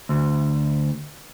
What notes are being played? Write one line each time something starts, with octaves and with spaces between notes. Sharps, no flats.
D2